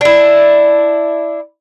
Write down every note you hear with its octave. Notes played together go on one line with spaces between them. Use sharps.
D4 E4